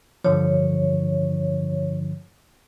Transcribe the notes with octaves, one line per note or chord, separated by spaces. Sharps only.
G2 D3 F3 C#5